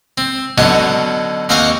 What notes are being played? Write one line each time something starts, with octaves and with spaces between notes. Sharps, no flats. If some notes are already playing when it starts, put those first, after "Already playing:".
C4
B2 D3 F#3 C#4 D#4 A5
D#2 C4 D#4 F5 F#5 C#6